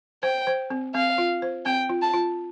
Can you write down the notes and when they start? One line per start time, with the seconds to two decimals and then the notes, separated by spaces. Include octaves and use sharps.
0.23 C5 G5
0.47 C5
0.70 C4
0.94 C4 F5
1.18 F4
1.42 C5
1.65 C4 G5
1.89 F4
2.02 A5
2.14 F4